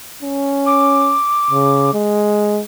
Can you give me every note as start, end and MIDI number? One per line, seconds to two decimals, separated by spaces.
0.22 1.17 61
0.66 1.91 86
1.51 1.91 49
1.94 2.61 56